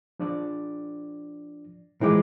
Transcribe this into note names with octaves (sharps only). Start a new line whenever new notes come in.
F3 D4 D5
E3 F3 G#3 A#4 G5 D6